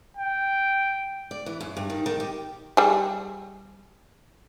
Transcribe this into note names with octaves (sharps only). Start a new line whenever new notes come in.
G5
D5
E3
F#2
G2
D#3
D#3
G4
G3 G#4